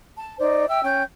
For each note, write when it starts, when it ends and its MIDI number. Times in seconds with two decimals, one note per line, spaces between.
0.17 0.36 81
0.39 0.66 63
0.39 0.66 72
0.39 0.66 74
0.68 0.83 76
0.68 0.83 79
0.68 0.83 88
0.83 1.02 61
0.83 1.02 79
0.83 1.02 91